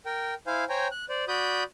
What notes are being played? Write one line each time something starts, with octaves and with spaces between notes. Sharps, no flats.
A#4 G5
E4 C5 F5 G#5
C5 C#5 G5 G#5 A#5
F#6
C5 D5
F#4 D5 B5 D#6 G6